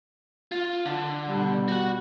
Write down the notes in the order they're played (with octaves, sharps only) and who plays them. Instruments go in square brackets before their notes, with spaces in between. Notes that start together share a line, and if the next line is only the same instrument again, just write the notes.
[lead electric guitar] F4
D3
[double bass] B2 G3
[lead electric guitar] F#4 F#5